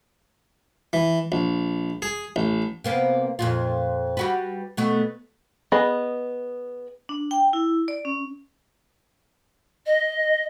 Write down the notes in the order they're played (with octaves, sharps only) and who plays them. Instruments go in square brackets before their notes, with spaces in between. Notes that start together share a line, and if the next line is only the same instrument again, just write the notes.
[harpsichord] E3
A#1
G#4
A1
[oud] C3 A#3 B3
F2 A#2 F4
G3 F#4 B4
B2 A3 B3
[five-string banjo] B3 G#4 D#5 B5
[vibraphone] D4
G5
E4
D5
C#4
[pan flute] D#5